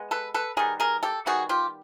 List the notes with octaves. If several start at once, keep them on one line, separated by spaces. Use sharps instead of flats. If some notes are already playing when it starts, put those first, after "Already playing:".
Already playing: G#3 B3
A4 B4
A4 B4
D#3 G3 B3 G#4 A#4
G#4 A#4
G4 A4
D#3 G3 B3 F#4 G#4
F4 G4